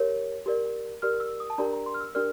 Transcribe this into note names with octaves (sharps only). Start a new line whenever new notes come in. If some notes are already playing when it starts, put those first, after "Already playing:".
Already playing: G4 A#4 C#5
G4 A#4 D5
G4 A#4 D5 F6
E6
D#6
A5
D4 G4 A#4 D5 A#5
A#5
C6
F6
E6
D4 G4 A#4 D5 F6